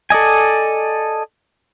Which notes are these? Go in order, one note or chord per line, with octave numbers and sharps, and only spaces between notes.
A4 D5 D#5 G#5